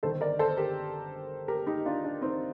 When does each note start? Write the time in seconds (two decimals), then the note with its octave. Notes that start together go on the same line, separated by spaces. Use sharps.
0.03 G1 G2 D#3 A4 C5
0.21 A#4 D5
0.39 A4 C5
0.57 G4 A#4
1.48 G4 A#4
1.67 D#4 G4
1.86 D4 F4
2.04 D4
2.22 C4 D#4